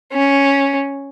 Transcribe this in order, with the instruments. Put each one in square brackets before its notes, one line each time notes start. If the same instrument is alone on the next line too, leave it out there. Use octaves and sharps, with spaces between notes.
[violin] C#4